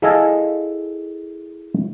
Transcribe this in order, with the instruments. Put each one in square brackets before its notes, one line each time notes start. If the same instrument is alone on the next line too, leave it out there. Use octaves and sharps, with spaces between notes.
[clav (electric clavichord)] E4 G#4 A4 D#5 F5